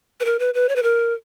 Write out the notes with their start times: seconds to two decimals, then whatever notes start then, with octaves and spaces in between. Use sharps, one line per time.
0.20 B4
0.25 A#4
0.39 B4
0.54 B4
0.69 C#5
0.76 B4
0.83 A#4